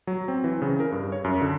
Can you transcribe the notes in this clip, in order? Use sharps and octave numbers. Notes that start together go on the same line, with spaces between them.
F#3
C4
E3
C#3
A#4
G2
C#5
F#2
D3